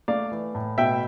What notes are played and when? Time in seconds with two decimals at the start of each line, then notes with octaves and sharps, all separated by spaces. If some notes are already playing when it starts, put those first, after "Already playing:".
0.08 A3 D5 F5
0.32 E3
0.55 A2
0.78 B2 E5 G5